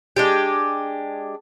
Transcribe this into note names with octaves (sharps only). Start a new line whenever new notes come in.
G#3 D4 G4